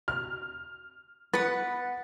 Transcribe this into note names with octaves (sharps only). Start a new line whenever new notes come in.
F6
B3 B4 F#5 A6